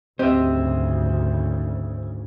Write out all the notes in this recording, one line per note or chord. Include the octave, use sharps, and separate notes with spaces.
D2 G#2 C#3 C4 G4 C5 D#5 E5